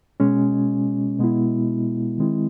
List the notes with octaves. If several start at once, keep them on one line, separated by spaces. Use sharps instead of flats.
B2 G#3 C#4
B2 G#3 B3 E4
D#3 G#3 C4 E4